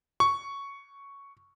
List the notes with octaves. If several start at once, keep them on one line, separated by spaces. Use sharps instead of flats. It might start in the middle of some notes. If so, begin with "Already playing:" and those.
C#6